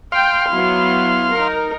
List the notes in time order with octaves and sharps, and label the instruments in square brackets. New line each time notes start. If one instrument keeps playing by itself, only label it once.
[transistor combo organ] F5 C6 [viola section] G5
[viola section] F#3 B3 E4
D#4 A#4